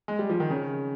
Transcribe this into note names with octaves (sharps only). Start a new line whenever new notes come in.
G#3
G3
F3
D#3
C#3